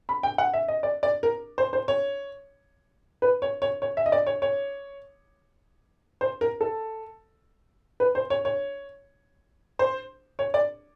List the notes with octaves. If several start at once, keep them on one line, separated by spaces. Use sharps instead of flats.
B5
G5
F#5
E5
D#5
D5
D5
A#4
C5
C5
C#5
B4
C#5
C#5
C#5
E5
D#5
D5
C#5
C#5
C5
A#4
A4
B4
C5
C#5
C#5
C5
C#5
D5